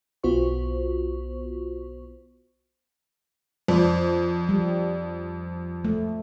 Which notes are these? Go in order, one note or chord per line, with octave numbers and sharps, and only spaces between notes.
B1 B3 F4 F#4 C5 C#6
F2 C5 D5
G3
A3